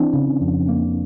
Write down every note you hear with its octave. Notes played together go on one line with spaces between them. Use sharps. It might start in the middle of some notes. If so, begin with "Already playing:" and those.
Already playing: E3 C4 D4
C#3
F2
A#3